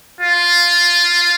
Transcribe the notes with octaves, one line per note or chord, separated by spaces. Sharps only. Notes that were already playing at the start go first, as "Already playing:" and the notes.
F4